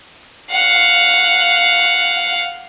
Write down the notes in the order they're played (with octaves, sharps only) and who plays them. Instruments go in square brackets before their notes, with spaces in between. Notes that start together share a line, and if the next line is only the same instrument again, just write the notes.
[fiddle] F5 F#5